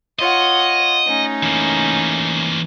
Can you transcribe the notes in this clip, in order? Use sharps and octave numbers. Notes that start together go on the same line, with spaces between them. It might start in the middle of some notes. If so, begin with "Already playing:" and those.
F4 C#5 D#5 F#5
A3 C#4 D#4
E3 A#3